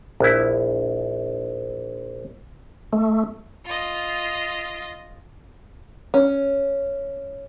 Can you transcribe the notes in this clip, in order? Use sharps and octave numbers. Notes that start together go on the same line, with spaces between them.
A#1 E4
A3
F4 D#5
C#4